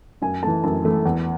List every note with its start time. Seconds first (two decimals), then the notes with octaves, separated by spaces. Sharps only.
0.22 F#2 G#5
0.43 E3 A3 A5
0.64 F#2 A5
0.84 E3 A3
1.05 E2